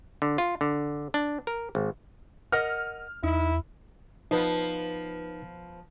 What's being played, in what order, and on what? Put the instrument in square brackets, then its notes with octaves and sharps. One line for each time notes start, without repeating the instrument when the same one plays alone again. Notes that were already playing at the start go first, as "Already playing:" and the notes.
[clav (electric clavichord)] D3
F4
D3
D4
A#4
G#1
[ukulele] A#4 D#5 F#5 [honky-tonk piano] F6
[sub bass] E2 [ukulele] D#4 [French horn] E4
[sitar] F3 B3 [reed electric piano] D#4 B4